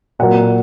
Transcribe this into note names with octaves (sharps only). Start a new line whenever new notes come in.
A#2 F#3 A#3 F#5